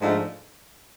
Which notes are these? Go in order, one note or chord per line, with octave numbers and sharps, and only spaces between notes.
G#2 F3 A3 D4 F4